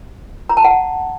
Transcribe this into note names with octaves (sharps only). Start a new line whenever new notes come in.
A#5
A5
F#5